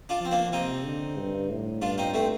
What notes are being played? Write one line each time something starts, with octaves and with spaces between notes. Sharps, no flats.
D4 F4
F3 C4
A#3 D4
C3 C4 D#4
D3
G2
A2
G2 D4 F4
C4 D#4
A3 C4